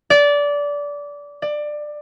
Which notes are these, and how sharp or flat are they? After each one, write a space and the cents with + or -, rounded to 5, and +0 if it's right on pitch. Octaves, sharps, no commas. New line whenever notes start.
D5 -20
D5 +20